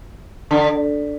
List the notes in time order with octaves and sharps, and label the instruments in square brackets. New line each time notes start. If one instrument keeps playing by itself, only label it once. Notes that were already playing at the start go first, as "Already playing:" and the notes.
[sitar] D3